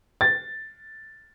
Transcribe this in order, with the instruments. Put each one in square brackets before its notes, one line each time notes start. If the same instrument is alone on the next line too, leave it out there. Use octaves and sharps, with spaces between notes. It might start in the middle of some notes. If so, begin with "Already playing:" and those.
[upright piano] A6